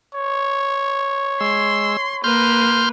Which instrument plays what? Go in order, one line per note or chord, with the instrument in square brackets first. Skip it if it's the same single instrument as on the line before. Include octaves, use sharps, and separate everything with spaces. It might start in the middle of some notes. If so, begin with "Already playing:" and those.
[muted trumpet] C#5
[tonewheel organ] G#3 E6 [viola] C6
[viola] A#3 B4 [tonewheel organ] C6 F6 G6